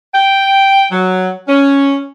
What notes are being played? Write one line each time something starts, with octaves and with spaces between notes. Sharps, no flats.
G5
F#3
C#4